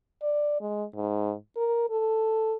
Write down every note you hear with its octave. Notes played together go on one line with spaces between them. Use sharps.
D5
G#3
G#2
A#4
A4